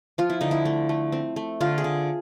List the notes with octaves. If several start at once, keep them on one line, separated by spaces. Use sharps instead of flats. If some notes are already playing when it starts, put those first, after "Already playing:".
F3 F4
E4
D3 D#4
E4
A3
A3
C4
A3
D3 F4
G#4
D3